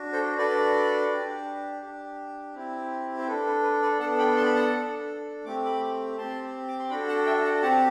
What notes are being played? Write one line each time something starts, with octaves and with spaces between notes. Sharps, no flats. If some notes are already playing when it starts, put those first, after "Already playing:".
Already playing: D4 F#4
A4 C5
D4 F#4 A4 B4 D5
D4 G4
D4 G4
C4 E4 G4
C5
D4 A4 B4
B4
B4
B4 D5
B3 D4 A4 F#5 A5
G5 B5
A5 C6
B5
F#5 A5
D4 A4
A3 C4 G4 D6
B5 D6
C4 G4 A5 C6
D6
C6
D4 F#4 A4 G5 B5
F#5 A5
E5 G5
F#5 A5
C4 G4 F#5 A5